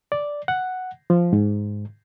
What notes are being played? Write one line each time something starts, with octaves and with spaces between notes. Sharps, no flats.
D5
F#5
F3
G#2